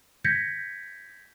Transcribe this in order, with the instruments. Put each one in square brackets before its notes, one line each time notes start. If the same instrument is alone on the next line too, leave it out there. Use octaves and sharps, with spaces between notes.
[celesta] G6 G#6 A#6 B6 C#7